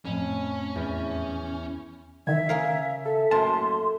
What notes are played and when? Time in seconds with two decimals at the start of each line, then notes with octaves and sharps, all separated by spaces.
0.05 F2 A2 C#4
0.76 E2
2.27 D#3 E3 E5 G#6
2.49 C#3 A#4 F5
3.05 A4 E5
3.31 F#2 A2 A#3 A5 C6